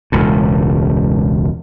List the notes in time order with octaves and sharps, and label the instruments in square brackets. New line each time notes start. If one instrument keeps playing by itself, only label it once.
[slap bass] E1 C#2 A2